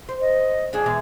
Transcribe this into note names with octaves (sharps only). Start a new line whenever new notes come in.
C5
D#5
F2 D4 G#4
B2 E3 G#3